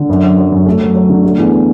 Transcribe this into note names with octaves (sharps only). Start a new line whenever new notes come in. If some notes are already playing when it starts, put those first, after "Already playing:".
Already playing: D3
F#2
F#3
F#3
F#2
A3
F#3
F#3
D3
A3
E2